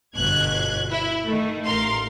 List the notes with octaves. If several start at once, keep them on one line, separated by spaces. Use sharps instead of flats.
G1 B2 F#6 G#6
E4
D#3 A3
A1 A#4 F5 C6